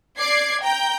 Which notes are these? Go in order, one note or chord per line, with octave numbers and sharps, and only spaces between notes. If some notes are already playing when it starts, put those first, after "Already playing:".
D5 D6 G#6 C7
G5 A#5 G6